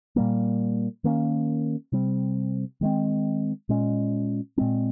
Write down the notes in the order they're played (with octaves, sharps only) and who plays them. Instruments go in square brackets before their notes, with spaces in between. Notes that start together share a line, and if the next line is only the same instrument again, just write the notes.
[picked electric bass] A#2 G3 A#3
D#3 A#3 C#4
C3 G3 C4
D#3 G#3 C4
A#2 G#3 C#4
A#2 G#3 C4